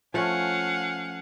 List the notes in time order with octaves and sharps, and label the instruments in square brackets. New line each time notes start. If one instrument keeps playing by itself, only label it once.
[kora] F3 A3 C#4 [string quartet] F5 F#5 G#5